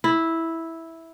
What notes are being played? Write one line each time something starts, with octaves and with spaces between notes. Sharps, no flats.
E4